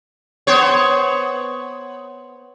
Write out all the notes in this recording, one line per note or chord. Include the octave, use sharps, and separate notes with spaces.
B3 C5 C#5